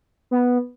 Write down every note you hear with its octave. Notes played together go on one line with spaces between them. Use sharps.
B3